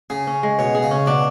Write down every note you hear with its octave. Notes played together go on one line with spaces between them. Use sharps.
C#3 G#4
C#4
G#3
B2 C#5
G#4
C#3
C#4
B2 D4